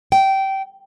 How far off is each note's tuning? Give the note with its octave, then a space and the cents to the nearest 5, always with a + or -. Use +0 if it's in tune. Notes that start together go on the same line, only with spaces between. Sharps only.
G5 -20